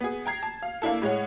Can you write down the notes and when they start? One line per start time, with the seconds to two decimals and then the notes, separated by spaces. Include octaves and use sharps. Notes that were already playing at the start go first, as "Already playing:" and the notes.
0.01 B3 G#4
0.26 G5 A#5 G#6 C7
0.43 A5
0.62 F5
0.82 A#3 D4 E4 A4
1.02 A2 G#3 C#5 F#5